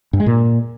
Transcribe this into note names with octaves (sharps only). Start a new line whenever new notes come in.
G2
G#3
A#2